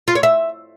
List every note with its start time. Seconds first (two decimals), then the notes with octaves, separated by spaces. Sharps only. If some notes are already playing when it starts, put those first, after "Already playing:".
0.08 F4
0.15 C#5
0.23 E5